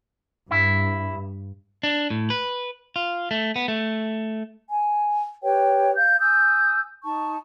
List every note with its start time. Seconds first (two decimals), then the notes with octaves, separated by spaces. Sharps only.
0.51 G2 E4
1.83 D4
2.10 A2
2.30 B4
2.96 F4
3.31 A3
3.56 B3
3.68 A3
4.70 G#5
5.42 G4 B4 C#5 G5
5.95 F5 G6
6.19 G#5 D#6 E6 G6
7.04 D#4 A5 C#6